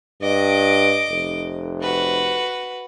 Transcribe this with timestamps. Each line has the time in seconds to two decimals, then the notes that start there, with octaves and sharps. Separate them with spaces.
0.22 G2 D#5 D6
1.10 F1
1.82 F#4 B4